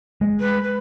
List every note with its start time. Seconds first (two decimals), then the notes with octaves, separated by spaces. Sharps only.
0.21 G#3
0.40 B4
0.63 B4